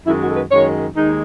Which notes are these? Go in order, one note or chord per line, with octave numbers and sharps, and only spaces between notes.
F#2 D#3 G#3 E4
F#4
A4
B4
F#2 D#3 G#3 C#5
D#2 D#3 G#3 D#4